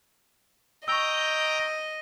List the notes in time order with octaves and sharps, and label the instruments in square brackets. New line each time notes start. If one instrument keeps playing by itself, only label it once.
[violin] D#5 [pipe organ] G5 A#5 G6 [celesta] C#6 E6